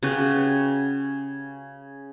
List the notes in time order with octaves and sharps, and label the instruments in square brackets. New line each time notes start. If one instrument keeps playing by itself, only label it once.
[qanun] C#3 F#4 G4 B4